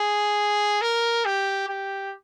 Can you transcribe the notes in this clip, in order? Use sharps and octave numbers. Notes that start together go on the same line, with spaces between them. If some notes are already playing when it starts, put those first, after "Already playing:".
Already playing: G#4
A#4
G4
G4